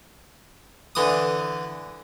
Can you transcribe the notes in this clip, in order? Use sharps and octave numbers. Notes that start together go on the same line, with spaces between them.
D3 E3 D#6